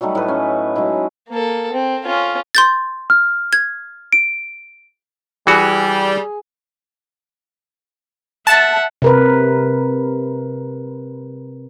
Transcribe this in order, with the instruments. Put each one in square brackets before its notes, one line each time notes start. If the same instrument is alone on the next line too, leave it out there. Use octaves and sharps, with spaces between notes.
[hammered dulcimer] F#3 G3 A3 D#4
A2 B4
C#4
F#3 G#3 D#4 E4
[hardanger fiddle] A#3 A4
C4
C#4 F4
[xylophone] C6 G6 A6
[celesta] F6
[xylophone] G#6
[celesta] D7
[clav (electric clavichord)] E3 F#4 [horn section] G3 [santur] G#4
[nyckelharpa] E5 F#5 [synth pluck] A5
[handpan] C3 A#4 B4